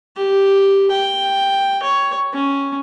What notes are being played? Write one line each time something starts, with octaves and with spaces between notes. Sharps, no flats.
G4
G5
C#5
C#4